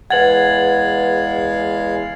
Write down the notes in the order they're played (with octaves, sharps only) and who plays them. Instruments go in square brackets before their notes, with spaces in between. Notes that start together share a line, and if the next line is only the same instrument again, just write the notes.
[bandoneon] E2 G#3 F5 [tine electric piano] B4 F#5 [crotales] G#6 A6 F#7